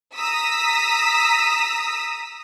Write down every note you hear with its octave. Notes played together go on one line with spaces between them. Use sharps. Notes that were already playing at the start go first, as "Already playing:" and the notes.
A#5 D#6 E6 B6